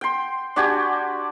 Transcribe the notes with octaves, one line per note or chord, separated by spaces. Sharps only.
G5 C6
D4 F#4 G4 G#5